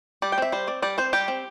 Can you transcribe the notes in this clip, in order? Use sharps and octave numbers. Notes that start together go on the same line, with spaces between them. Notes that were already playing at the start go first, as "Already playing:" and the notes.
G3 D5
G5
C4 E5
G3 C5
C4 D5
G3 D5
C4 C5
G3 G4
C4